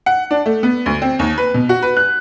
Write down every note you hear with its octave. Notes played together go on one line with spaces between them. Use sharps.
F#5
D4
A3
B3
D2
C4
D#2
B4
B2
F#4
B4
F#6